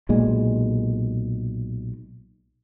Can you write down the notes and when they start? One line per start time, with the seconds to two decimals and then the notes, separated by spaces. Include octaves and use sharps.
0.09 B1 A#2 G#3